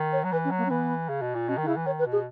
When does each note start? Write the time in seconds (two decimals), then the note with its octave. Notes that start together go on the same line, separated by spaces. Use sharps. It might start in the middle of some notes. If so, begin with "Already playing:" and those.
Already playing: D#3
0.13 C#5
0.24 F#3
0.32 E3 B4
0.45 C#4
0.51 F#3
0.58 A#3
0.66 C#4
0.70 E3 B3
1.09 C#3
1.22 B2
1.35 A#2
1.48 B2 C#4
1.57 D#3
1.63 D#4
1.67 C#3 E4
1.77 E3
1.86 D#3 C#5
1.99 B4
2.06 B2
2.12 G#4